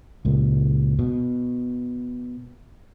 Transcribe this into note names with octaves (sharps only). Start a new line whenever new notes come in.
C#2 A#2
B2